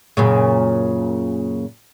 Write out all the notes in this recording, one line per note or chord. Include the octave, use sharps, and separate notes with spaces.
F#2 A#2 C#3